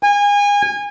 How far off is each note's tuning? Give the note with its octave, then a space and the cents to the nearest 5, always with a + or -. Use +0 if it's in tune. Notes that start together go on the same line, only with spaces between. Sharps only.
G#5 -30